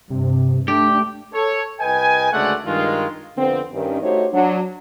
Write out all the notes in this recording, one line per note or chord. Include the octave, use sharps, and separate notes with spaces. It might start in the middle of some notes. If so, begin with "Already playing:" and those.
G2 C3
A3 D4 G4
A4 C#5
C2 B4 D#5 G5 G#5
D2 C#3 G#3 A3 D5 F#5
G2 D#3 G#3 F4
F2 D3 B3 C4
G2 D#3 C#4
A3 D#4 F#4 G4 C5 C#5
F#3 D4